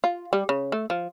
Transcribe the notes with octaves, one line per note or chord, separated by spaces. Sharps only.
F4
G3
C#3
A3
F3